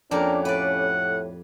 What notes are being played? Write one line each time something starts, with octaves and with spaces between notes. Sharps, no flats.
F2 A#3 C#4 D4 G4 A#4
A2 B4 D5 F#5